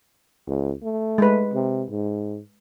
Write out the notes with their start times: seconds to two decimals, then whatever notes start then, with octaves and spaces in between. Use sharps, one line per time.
0.47 C#2
0.83 A3
1.18 G#3 B4
1.54 C3
1.90 G#2